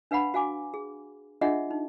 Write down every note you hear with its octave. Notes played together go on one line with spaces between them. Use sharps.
D4 B4 F5 F#5 B5
F#4 F5 G#5 D6
G#4
D4 F4 G#4 D#5 E5 F#5
D#4